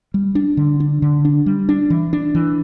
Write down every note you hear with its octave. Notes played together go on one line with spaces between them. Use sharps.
G3
D4
D3
D4
D3
D4
G3
D4
E3
D4
E3